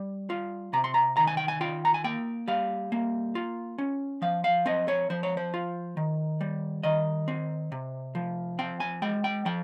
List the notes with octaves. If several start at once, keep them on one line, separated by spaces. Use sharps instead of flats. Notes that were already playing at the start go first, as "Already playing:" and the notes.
Already playing: G3
F4
C3 A#5
C6
A#5
D#3 A#5
G#5
G5
G#5
F4 G5
A#5
G#5
A#3 G5
G3 F5
A#3
F4
C#4
F3 F5
F5
C4 D#5
C#5
F3 C5
C#5
C5
F4
D#3
G3
D#3 D#5
C4
C3
F3
C4 G5
G#5
G#3 G5
G5
F3 G5